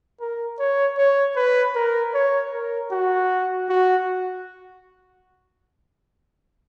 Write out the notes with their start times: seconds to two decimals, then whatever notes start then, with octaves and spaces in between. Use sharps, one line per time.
0.21 A#4
0.59 C#5
0.98 C#5
1.36 B4
1.75 A#4
2.14 C#5
2.53 A#4
2.91 F#4
3.69 F#4